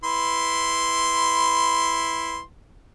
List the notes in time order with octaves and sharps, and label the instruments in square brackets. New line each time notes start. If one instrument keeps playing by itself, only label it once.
[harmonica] E4 B4 C6